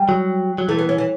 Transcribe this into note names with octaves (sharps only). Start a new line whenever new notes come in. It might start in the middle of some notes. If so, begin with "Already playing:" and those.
Already playing: G3
F#3
F#3
E3 A3
B3
C#4
E3